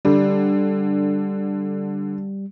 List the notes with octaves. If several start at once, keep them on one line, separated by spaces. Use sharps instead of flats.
D3 G3